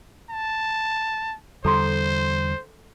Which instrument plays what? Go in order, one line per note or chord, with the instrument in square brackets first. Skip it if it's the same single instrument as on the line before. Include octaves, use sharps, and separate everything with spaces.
[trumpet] A5
[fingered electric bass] E2 D3 G3 [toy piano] A4 A#5 C6 [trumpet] C5